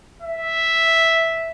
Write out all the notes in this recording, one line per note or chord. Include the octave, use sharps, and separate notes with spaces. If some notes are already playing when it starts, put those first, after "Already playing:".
E5